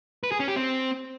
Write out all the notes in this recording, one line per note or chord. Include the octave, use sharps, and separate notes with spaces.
B4
G#4
C#4
G4
C4